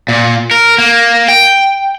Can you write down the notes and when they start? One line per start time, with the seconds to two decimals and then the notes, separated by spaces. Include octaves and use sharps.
0.08 A#2
0.51 A#4
0.78 A#3
1.29 G5